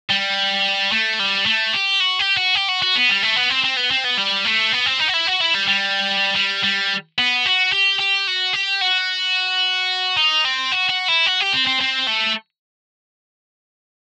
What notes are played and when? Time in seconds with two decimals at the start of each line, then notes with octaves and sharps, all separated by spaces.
0.10 G3
0.92 A3
1.19 G3
1.46 A3
1.73 G4
2.00 F#4
2.19 G4
2.37 F#4
2.55 G4
2.69 F#4
2.82 F#4
2.96 B3
3.10 G3
3.23 A3
3.36 B3
3.50 C4
3.65 C4
3.77 B3
3.91 C4
4.05 B3
4.18 G3
4.45 A3
4.73 B3
4.86 C4
5.00 D#4
5.08 F#4
5.14 E4
5.27 F#4
5.41 E4
5.55 G3
5.68 G3
6.36 G3
6.63 G3
7.19 B3
7.46 F#4
7.72 G4
7.99 G4
8.27 F#4
8.53 G4
8.82 F#4
10.17 D#4
10.45 C4
10.72 F#4
10.90 F#4
11.08 E4
11.26 F#4
11.40 G4
11.53 C4
11.67 C4
11.81 C4
12.07 A3